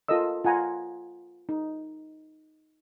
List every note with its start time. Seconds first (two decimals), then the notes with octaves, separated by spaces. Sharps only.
0.08 F4 A4 A#4 D#5 E6
0.44 F4 F#5 G#5 A#5
1.49 D#4